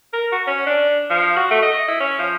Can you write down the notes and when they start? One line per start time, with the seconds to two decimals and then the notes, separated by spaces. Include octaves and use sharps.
0.13 A#4
0.32 F#4
0.47 C#4
0.67 D4
1.10 F3
1.36 F#4
1.51 A3
1.63 D#5
1.88 E4
2.00 C#4
2.19 F3